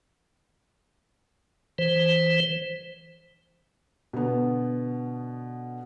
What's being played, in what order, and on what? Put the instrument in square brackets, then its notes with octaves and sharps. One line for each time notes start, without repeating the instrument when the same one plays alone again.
[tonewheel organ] E3 C5
[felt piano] B2 D3 B3